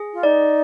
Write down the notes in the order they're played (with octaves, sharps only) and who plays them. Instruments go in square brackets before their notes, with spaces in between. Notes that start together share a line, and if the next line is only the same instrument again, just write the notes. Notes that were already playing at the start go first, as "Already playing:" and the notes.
Already playing: [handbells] G#4
[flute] F4
[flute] D#4 [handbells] D5